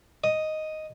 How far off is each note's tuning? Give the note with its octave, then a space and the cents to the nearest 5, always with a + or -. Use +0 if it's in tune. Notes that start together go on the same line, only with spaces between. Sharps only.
D#5 +0